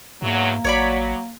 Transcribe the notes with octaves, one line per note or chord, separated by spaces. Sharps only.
E2 G#2 F#3 A#3
A1 F#3 C#5 D5 B5